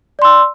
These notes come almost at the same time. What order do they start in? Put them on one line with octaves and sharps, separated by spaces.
D5 C6 E6